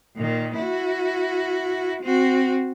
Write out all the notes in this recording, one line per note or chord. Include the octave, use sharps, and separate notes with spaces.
A#2 D#3
E4 F#4
C4 F#4